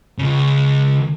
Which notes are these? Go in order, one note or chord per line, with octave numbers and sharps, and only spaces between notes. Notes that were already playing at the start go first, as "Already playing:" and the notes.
C#2 C#3